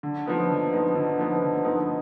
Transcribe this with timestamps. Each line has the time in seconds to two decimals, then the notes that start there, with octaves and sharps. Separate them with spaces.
0.03 D3
0.26 F3 B3 D#4
0.48 D3
0.73 F3 B3 D#4
0.95 D3
1.19 F3 B3 D#4
1.42 D3
1.64 F3 B3 D#4